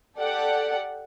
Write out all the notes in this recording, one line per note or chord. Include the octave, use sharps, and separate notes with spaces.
G4 A4 D5 F#5